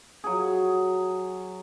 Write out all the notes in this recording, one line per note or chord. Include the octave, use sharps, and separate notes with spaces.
F#3 G#4